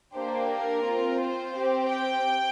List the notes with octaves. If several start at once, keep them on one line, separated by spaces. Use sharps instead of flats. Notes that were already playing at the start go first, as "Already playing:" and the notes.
A#3 D4 G4 C5
A#4
C4 F4
C5
C4 G4
G5